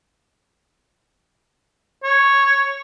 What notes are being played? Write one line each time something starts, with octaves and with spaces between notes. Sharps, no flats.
C#5